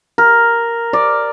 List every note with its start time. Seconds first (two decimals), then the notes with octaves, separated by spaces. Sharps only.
0.18 A#4
0.93 D5